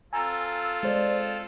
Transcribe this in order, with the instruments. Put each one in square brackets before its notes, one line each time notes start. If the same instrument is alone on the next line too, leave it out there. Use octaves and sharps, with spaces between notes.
[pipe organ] C4 F4 A4 [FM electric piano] G#5 A#5 [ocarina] E6
[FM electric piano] G#3 C5 [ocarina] D5